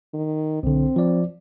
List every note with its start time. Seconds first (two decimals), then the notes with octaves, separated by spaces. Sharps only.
0.14 D#3
0.63 B1 D3 C4
0.96 F3 D5